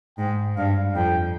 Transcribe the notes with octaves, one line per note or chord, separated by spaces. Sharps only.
G#2 G5
G2 F5
F2 G5